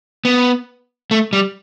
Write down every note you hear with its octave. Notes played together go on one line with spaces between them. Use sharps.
B3
A3
G3